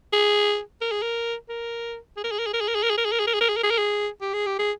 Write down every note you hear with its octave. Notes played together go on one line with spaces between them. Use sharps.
G#4
A#4
G#4
A#4
A#4
G#4
A#4
G#4
A#4
G#4
A#4
G#4
A#4
G#4
A#4
G#4
A#4
G#4
A#4
G#4
A#4
G#4
A#4
G#4
A#4
G#4
A#4
G#4
G4
G#4
G4
G#4